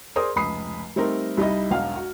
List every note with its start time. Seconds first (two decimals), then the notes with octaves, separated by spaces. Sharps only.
0.16 G#4 A#4 C5 D5 C6 D#6
0.36 F1 C#2 B5 D#6 C7
0.96 G3 A3 C4 D#4 A#4
1.37 C2 G3 D#4 E4 D#5
1.71 E1 B1 F5 F#5 F6
1.96 F#4